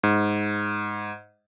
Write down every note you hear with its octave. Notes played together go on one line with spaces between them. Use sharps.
G#2